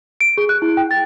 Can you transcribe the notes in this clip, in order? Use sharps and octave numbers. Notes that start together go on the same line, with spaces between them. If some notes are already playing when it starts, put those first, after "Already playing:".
D7
G#4
F#6
E4
G5
A6